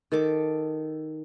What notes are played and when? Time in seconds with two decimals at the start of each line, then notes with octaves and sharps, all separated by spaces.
0.12 D#3 A4 D6